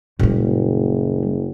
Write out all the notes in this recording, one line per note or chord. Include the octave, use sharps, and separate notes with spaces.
F#1 A#2 G3